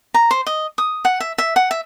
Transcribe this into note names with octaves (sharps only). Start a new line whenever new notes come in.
A#5
C5
D#5
D#6
F#5
E5
E5
F#5
E5